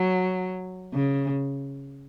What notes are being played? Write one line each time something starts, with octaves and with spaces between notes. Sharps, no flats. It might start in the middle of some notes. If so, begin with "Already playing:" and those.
Already playing: F#3
C#3